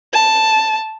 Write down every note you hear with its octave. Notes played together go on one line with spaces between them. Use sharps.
A5